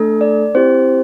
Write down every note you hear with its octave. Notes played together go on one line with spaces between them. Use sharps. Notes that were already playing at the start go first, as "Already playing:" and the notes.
Already playing: A3 D4 A4
D5
C4 E4 G4 C5